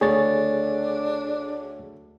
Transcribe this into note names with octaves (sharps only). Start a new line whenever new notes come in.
D2 A3 D4 G#4 C#5 A6